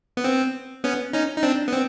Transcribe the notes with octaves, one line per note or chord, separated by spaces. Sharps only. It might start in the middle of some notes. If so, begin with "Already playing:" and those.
B3
C4
B3 C#4
C#4 D#4
D#4
C4 D4
B3
C4